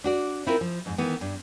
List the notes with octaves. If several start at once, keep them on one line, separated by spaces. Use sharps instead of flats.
D4 F#4 D5
C4 E4 F4 A#4
F3
F2 G#2
D#3 E3 B3
G2